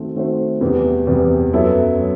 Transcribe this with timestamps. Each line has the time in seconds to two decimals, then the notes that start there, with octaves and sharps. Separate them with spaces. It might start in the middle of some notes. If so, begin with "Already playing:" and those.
Already playing: D#3 A3 C4 F#4 C5
0.15 D#3 A3 C4 F#4 C5
0.61 E2 C3 E3 G3 B3
1.07 E2 C3 E3 G3 B3
1.53 F#2 F#3 B3 E4 A4
2.00 F#3